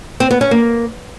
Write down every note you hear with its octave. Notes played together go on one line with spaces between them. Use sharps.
C4
B3
C#4
A#3